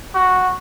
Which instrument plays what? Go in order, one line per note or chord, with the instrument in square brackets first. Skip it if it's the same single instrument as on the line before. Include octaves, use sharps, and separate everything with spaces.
[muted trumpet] F#4